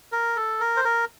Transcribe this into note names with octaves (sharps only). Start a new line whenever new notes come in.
A#4
A4
A#4
C5
A#4